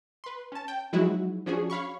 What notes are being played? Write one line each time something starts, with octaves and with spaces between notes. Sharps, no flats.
B4 C6
C#4 A5
G5
F3 F#3 G#3 D#4 E4 F#4
F3 C#4 D4 F#4 G#4
C#5 F5 B5 C#6